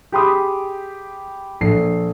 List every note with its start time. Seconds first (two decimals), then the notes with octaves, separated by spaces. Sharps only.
0.12 G4 G#4 G5 B5 C6 D#6
1.61 A#1 A4 C7